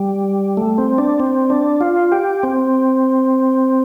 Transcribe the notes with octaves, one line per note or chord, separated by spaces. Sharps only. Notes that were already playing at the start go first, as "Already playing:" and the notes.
Already playing: G3
A3
C4
D4
C4
D4
F4
G4
C4